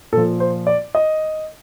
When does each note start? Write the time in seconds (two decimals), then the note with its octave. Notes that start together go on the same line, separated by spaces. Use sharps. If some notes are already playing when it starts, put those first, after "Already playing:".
0.13 A#2 A4
0.17 F3
0.40 C5
0.67 D5
0.95 D#5